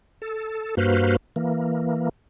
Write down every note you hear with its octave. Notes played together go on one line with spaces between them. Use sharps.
A4
G2 A#3 F#4 B4 C5 F6
E3 A#3